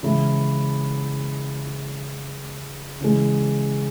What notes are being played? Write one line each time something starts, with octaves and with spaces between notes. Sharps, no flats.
C#3 E3 G#3 E4
C#3 E3 G#3